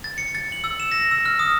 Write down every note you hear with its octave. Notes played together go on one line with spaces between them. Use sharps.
A6
C#7
A6
F#7
E6
E7
A#6
E6
F6
D#6